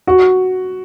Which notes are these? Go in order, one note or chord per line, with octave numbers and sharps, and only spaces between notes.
F#4